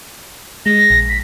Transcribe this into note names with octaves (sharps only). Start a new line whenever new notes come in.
G#3 A#6
A#1
B6